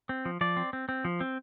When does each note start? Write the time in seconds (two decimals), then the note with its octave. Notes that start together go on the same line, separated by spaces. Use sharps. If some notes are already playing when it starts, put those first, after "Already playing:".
0.09 C4
0.25 F3
0.41 F3 D5
0.57 C4
0.73 C4
0.89 C4
1.05 F3
1.20 C4